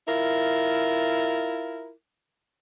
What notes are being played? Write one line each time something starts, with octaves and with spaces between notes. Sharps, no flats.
E4 F4 A#4